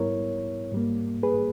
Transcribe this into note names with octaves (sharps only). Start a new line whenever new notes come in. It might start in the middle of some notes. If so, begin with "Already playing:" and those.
Already playing: G#2 G3 B3 E4 A#4 C#5
G#2 G3 A#3
G#4 B4